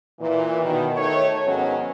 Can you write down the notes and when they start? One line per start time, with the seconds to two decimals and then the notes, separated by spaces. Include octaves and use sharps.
0.20 A#2 E3
0.62 B2 D#3
0.96 D#3 A3 C#5
1.45 G#2 D#3 F#3 B3 C#4